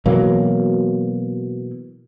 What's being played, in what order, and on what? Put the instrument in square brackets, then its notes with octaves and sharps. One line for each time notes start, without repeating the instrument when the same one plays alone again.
[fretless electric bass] B2 E3 F#3 A#3